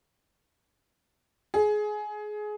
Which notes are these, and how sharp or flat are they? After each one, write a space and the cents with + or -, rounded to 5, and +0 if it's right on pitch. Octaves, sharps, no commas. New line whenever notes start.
G#4 +20